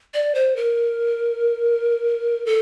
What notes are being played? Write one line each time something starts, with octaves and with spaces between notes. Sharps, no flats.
D5
C5
A#4
A4